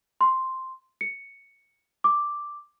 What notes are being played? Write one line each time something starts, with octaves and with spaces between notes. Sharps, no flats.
C6
C#7
D6